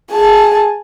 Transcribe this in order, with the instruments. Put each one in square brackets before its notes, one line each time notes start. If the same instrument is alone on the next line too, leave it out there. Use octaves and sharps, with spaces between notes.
[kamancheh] G#4 A5